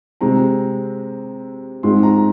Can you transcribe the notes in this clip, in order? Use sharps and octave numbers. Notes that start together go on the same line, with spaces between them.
C3 G#3 C4 A#5
G#2 G#3 C4 C6
A#5